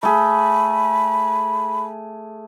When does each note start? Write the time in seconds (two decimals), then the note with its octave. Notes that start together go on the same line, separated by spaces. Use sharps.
0.03 A3 G#4 B5